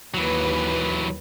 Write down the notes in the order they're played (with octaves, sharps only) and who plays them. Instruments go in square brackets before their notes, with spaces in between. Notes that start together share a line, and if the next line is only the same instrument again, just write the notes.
[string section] D#2 B4 [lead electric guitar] E3 F#3